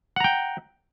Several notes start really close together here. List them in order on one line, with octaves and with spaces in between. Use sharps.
F#5 A#5 G5